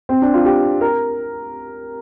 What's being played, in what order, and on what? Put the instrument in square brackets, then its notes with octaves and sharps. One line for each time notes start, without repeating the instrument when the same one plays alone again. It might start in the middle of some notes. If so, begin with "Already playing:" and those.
[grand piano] C4
D4
F4
G4
A#4